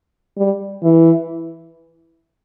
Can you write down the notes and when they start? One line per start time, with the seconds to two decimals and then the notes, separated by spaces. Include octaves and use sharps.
0.37 G3
0.83 E3